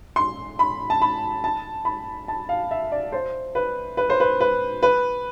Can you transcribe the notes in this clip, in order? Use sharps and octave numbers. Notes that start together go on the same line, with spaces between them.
C6
B5
A5
B5
A5
B5
A5
F5
E5
D5
C5
B4
B4
C5
B4
B4
B4